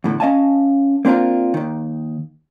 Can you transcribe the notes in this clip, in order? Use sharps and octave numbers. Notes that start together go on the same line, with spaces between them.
E2 A2 D3
C#4 D#5 F5 G#5 A5
A#3 C4 D4 F4 A#4
D#2 D#3